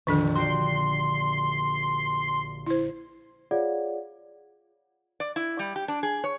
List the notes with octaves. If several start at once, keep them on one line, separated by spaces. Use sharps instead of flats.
A#1 F2 D3 D#3 D4 A4
F#4 G4 D5 C6
E4 C5
F4 G#4 C#5 D5 F5 F#5
D5
E4
G3
G4
D4
G#4
C#5